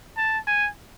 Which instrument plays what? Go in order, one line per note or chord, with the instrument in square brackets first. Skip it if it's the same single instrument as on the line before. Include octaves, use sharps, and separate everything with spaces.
[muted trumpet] A5
G#5